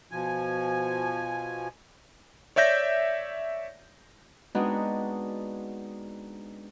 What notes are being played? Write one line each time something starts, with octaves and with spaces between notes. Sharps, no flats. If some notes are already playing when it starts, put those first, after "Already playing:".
B2 F3 G#5
C#5 D5 E5 G6 A#6
G#3 B3 C4 D4 D#4 F#4